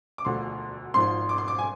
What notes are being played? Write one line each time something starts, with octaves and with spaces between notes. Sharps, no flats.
D6
E1 D2 D3 F3 C6
G#1 G#2 F3 C6
D6
C6
D6
G#5